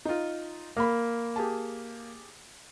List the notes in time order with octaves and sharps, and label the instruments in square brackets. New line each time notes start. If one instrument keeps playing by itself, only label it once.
[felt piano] D#4 F4
[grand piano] A#3 [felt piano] B5 F6
[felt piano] G4 G#4 A5